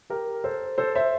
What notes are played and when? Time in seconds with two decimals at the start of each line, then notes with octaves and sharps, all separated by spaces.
0.10 G4 A#4
0.44 A4 C5
0.78 A4 C5
0.95 C5 E5